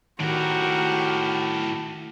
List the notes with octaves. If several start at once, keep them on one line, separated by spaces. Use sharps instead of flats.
A2 D#3 F#4 G4 A#4